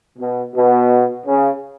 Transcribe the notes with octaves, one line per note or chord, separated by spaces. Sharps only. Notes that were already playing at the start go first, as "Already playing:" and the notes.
B2
B2
C#3